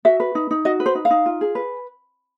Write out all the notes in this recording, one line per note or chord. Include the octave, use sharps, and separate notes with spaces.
F#4 E5
B4
D#4
D#4
F#4 D#5
B4
C5
D#4
F5
D#4
F4
G#4
B4